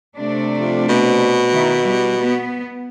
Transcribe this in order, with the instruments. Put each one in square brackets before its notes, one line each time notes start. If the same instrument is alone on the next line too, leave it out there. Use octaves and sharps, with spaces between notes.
[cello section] C3 A3 D4
[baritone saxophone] F2
B2
[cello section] D#3 E4
G3
B3